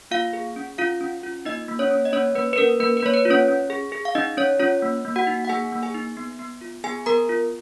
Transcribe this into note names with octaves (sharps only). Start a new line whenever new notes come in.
A#3 F4 F5
G#4
C#4
C#4 F4 F5
C#4
F4
A#3 D#4 D#5
A#3
C#4 C#5
C#4
D#5
A#3 C#4 C#5
A#3 B4
B4
C#4 A#4
A#3 B4
B4
A#3 C#5
B4
F4
C#4 C#5
C#4
G#4
G#4
F5
C#4 D#4 D#5
C#4 C#5
C#4 F4 C#5
A#3
A#3
F#4 F#5
D#4
F#5
A#3 G#4 G#5
A#3
G#4 G#5
D#4
B3
B3
F4
B3 G#4 G#5
B3 A#4 A#5
F4